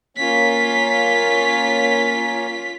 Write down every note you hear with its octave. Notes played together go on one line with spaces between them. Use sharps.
A#3 C#4 F4 C#5 B6